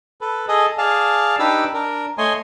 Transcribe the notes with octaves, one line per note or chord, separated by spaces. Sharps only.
A4 B4
G#4 A4 D#5
G#4 D5 F5 A5
D4 D#4 G4 B4 D6 E6
D4 A#4
A3 C#5 D#5 G#5 C6